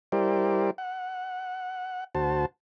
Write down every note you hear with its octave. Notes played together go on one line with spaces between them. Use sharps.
G3 E4 G4 A#4 C5 D5
F#5
D2 F#4 C5 A5